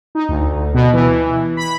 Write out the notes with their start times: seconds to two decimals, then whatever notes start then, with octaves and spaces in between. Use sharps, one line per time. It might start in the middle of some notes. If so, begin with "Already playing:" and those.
0.15 D#4
0.29 D2
0.74 B2
0.93 E3
1.57 B5